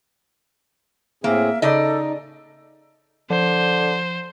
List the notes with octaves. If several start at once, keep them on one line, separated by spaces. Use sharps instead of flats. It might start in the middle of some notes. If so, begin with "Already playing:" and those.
A2 A#3 C4 G#4 E5
C#3 D#4 A4 D5 D#5
D3 F3 C5